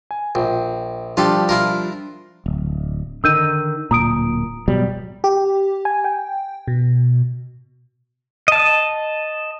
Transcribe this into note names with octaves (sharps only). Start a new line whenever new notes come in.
G#5
A#1 G5
F3 G3 D4 F4 G4 A4
E4 F4 A#4
D1
D3 D#3 E6 G6 D#7
D1 A#2 A#5 D#6 D7
B2 F#3 G3
G4
G#5
G5
B2
D#5 A5